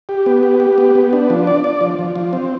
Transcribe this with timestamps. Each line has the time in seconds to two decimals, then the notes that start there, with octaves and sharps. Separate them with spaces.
0.09 G4
0.26 B3
0.43 G4
0.60 G4
0.78 B3
0.95 B3
1.13 D4
1.30 F3
1.47 D5
1.64 D5
1.81 F3
1.99 F3
2.16 F3
2.33 C4